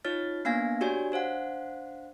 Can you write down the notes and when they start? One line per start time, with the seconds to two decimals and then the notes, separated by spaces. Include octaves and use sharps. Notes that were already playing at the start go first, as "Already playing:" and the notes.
0.05 D#4 F4 C#5 F6 A6
0.45 A#3 B3 D4 F5 G#5 A#6
0.81 D4 F#4 G4 C#5 D5 G#5
1.12 D4 C5 F5 F#5